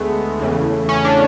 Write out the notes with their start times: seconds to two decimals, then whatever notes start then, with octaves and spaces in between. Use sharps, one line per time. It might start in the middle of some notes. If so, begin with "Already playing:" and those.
Already playing: D2 D3 G#3 A3 B3
0.39 E2 C#3 E3
0.89 C#4
1.05 D4